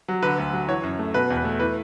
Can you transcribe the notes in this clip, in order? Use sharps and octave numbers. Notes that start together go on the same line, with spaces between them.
F#3
D3 B4
D2
F#3
E3 C#5
F#2
A3
B2 B4
E2
B4
A3
E3 B4